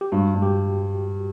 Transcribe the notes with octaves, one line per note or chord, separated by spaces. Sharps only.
G4
G2 F#4
G2
G4